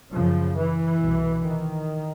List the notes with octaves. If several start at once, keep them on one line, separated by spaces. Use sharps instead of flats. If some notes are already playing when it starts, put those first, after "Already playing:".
F#2 C#3 F3
E3
C2 B2
D#3